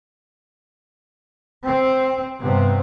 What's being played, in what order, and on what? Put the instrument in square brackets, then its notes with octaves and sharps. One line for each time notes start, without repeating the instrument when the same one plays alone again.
[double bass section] C4
G2 C3 B3 C4